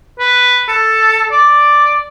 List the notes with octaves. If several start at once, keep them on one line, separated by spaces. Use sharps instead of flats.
B4
A4
D5